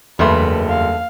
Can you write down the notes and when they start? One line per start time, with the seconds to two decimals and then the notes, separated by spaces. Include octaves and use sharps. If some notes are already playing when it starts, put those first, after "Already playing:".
0.19 F#1 E2 G2 A3 B4 B5 C6
0.69 F5